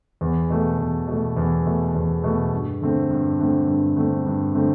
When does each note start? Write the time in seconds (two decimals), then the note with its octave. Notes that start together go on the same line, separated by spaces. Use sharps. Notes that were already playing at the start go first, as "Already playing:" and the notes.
0.21 E2
0.50 B2 A3
0.79 E2
1.08 B2 A3
1.36 E2
1.65 B2 A3
1.95 E2
2.24 B2 A3
2.53 G2
2.81 D3 A3 C4
3.11 G2
3.39 D3 A3 C4
3.68 G2
3.97 D3 A3 C4
4.26 G2
4.54 D3 A3 C4